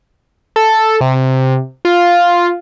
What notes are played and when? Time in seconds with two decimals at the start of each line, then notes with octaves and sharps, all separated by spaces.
0.56 A4
1.01 C3
1.85 F4